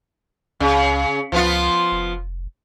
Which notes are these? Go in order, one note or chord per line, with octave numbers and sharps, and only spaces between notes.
C#2 C#3
C#2 F3 B3 F4
F1